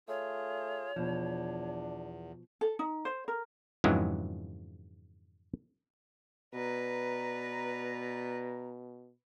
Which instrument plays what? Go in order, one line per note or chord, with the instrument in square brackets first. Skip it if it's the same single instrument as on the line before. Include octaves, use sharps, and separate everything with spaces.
[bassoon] A3 [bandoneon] F4 G#4 [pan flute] C#5
[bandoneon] E2 [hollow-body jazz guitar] B2 F3 [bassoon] D4
[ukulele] A4
D#4
C5
A#4
[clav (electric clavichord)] F2 G#2 C#3 E3 F#3 G#3
[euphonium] B2 [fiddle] B4 [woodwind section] D5 A#5